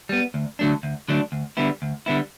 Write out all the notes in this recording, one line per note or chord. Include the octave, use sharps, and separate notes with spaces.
G3 B3
D2
D3 F#3 A3 D4
D2
D3 F#3 A3 D4
D2
D3 G3 B3 E4
D2
D3 G3 B3 E4